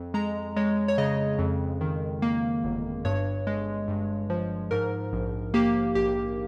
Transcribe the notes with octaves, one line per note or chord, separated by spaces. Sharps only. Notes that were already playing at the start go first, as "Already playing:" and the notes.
Already playing: F2
G#3 A#5
G#3 C#5
C#5
C#3 D#5
F2
D#3
A#3
G1
G2 C#5
G#3
G2
F3
G#2 A#4
A#1
A#3 G4
A#1 G4